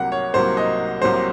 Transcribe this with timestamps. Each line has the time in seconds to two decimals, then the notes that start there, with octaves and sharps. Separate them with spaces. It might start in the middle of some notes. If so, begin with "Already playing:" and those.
Already playing: C2 C3 F#3 A#3 F#5
0.12 C#5
0.34 C2 C3 F#3 A#3 C5
0.57 D#5
1.02 C2 C3 F#3 A#3 C5